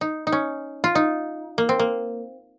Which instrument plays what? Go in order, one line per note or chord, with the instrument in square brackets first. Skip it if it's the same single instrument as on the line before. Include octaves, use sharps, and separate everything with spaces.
[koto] D#4
D#4
C#4
F4
D#4
A#3
C4
A#3